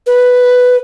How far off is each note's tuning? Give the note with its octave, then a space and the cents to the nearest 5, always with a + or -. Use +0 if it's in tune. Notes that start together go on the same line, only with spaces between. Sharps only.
B4 +5